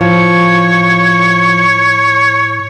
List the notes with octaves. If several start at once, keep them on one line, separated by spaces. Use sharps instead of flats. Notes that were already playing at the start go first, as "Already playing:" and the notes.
A2 F3 C#5